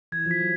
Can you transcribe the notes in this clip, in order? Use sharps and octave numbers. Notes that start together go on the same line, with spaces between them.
E3 G#6
F3
B6
F#3